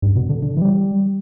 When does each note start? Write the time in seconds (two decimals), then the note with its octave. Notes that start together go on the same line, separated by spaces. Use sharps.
0.02 G2
0.16 B2
0.29 D3
0.43 D3
0.57 E3
0.62 G3